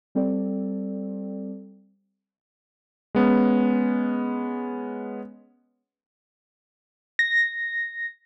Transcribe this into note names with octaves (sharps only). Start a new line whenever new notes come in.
G3 C4 A4 D5
G#3 B3 C#4
A#6